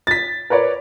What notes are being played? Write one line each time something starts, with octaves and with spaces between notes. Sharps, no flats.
A6 B6
A#4 B4 C#5 D5